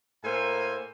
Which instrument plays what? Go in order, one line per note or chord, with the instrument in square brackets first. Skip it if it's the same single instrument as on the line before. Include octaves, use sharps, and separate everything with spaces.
[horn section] A2 A#3 A4 A#4 C5 G#5